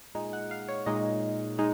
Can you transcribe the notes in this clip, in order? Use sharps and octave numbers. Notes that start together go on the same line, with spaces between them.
A#2 G#3 D#4
F#5
F5
C#5
A#2 G#3 D#4 D#5
G#3 D#4